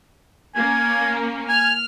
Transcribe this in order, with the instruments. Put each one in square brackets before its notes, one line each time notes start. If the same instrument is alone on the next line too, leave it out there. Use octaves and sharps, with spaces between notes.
[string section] A#3 C#4 [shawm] G#5
[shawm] G#5 [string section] F6